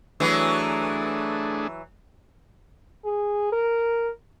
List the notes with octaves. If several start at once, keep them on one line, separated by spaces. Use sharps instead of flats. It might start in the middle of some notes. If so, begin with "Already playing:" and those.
E3 F#3 A3 D4 G#4
G#4
A#4